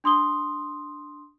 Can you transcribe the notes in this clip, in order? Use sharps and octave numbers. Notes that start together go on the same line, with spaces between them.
D4 C6 D#6 G7